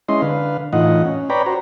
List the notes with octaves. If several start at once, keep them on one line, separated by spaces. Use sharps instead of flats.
G#3 C#4 E4 D#5 C6
D3 B4 F5
A2 E3 D#4 F4 D#5 F#5
C#4
B4 C#5 D5 G5 A#5 B5
F#4 C5 A#5